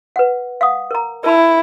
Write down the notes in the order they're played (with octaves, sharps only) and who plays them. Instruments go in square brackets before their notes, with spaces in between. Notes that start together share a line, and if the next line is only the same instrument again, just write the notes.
[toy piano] B4 F#5
F5 F#5 D#6
A#4 A#5
[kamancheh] E4 [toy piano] A#4 A5 B5